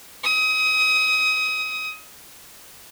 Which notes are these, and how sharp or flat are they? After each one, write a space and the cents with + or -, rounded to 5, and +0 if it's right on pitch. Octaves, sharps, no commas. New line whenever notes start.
D#6 +25